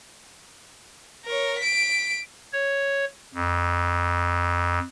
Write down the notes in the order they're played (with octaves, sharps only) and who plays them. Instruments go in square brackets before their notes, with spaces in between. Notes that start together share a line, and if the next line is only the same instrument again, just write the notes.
[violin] A#4 C#5
B6 D7
[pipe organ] C#5
F2